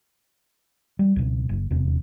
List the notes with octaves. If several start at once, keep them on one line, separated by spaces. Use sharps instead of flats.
G3
C#2 B2
F#1
D#1 E2 C3